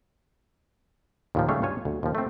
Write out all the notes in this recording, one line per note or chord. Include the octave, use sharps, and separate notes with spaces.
D#2 A#2 F3
C#3 G3 A3 C#5 F5
G2 F4 C#5 G#5
D2
D#2 F3
A3 C4